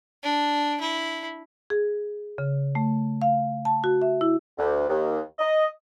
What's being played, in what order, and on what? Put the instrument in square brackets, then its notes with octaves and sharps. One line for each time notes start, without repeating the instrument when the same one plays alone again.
[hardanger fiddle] D4
E4
[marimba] G#4
C#3
A3
F5
A5
F#4
E5
E4
[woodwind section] D2
D#2
D#5